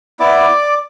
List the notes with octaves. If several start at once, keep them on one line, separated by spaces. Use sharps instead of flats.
B3 E4 D5 D6